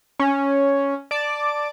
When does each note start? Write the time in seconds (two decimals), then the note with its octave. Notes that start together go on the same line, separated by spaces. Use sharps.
0.19 C#4
1.11 D5 A5 D6